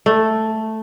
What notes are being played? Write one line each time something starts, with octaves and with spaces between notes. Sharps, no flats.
A3